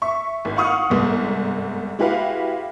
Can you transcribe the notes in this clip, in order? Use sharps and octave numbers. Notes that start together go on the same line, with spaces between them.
E5 C#6
G#1
F5 F#5 C#6 D#6 F6
G1 C2 G#2
G#3 E4 F#4 G4 B4 F5